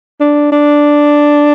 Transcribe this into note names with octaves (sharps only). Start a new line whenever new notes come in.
D4
D4